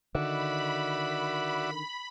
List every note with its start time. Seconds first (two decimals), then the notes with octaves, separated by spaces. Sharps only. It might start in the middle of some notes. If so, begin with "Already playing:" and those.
0.15 D3 D#3 F#4 D5 E5 B5